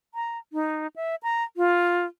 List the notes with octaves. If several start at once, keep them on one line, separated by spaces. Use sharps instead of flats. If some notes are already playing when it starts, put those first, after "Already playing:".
A#5
D#4
E5
A#5
F4